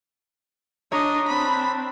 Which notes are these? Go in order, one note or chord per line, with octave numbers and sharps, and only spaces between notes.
D4 C#5 D#5 A#5
C4 D4 B5